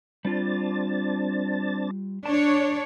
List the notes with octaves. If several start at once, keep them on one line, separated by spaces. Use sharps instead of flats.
G3 C4 D4 F4 A5
D4 C#5 D5 A5